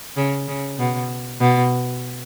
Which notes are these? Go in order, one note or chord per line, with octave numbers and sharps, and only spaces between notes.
C#3
C#3
B2
B2